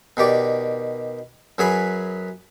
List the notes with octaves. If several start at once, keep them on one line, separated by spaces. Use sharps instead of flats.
B2 D#3 G4 D5
F#2 F#3 G#4 B4 B5